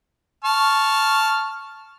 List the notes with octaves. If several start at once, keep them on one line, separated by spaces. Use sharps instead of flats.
A5 C#6 F6